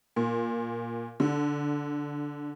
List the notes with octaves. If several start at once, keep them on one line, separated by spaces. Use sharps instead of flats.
A#2
D3